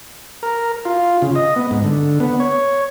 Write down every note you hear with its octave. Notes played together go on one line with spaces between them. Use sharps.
A#4
F4
C#3
D#5
B3
G#2
D3
B3
C#5